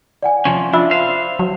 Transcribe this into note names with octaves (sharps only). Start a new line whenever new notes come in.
D5 F#5 G#5
C3 F3 C#4
D4 F4 E5 B5 E6
C5 F5
F#3